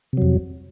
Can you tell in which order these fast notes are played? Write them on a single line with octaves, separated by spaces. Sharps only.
C3 F#3 F2